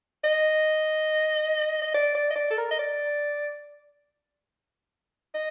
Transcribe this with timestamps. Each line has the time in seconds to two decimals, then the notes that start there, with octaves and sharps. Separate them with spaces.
0.24 D#5
1.82 D#5
1.94 D5
2.15 D5
2.30 D#5
2.36 D5
2.50 A4
2.58 A#4
2.71 D#5
2.79 D5
5.34 D#5